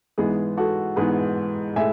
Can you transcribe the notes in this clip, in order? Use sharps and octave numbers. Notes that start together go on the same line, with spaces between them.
G#2 E3 G#3 B3 G#4
F#4 A4
G#2 E3 G#3 B3 G#4 B4
A2 G#3 E5 G#5